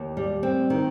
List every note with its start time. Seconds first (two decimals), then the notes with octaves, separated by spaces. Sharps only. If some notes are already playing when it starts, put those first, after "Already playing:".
Already playing: D#2
0.17 G3
0.43 C4
0.70 D#3